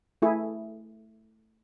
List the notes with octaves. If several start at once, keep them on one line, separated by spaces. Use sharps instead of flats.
A3 E4 G#4